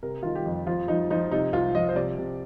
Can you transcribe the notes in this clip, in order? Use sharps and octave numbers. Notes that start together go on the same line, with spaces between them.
C3 A#4
D#3 F4
G4
F2
F3 F4
F3 D#4
F3 D#4
C3 D#4
C2 F4
F3 D#5
C5
C3 D5
C3